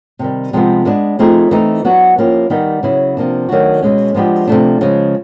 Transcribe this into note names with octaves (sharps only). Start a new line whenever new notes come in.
C3 D#3 G3
C3 F3 G#3 B3
G#3 B3 D4
F3 A3 C4 D#4 G#4
E3 A3 C4 D#4
F#3 B3 D4 F#4
F3 A#3 C#4 E4 G4
D#3 G3 B3 D#4 G4
C#3 F#3 B3 E4
C3 F3 A#3 D4
D#3 F#3 A3 D4 F#4
B2 G#3 C#4
F3 G#3 B3 D4 G4
C3 F3 A3 D4
C#3 F3 G#3